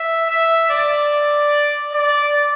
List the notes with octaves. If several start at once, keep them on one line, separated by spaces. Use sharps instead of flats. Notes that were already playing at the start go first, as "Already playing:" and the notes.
Already playing: E5
E5
D5
D5